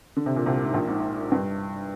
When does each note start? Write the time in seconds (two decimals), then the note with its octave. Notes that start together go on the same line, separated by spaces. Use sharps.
0.17 D3
0.26 C3
0.36 A#2
0.46 C2 C3
0.64 G#2
0.74 A#1 A#2
0.88 G#2
1.32 G2